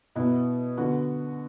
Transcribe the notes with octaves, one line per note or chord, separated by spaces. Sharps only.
B2 B3 E4
D3 B3 F#4